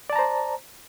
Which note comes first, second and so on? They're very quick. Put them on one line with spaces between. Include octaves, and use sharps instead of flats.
D5 A5 A#5 C5